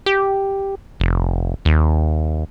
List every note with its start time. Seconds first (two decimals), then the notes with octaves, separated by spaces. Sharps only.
0.06 G4
1.00 F1
1.65 D#2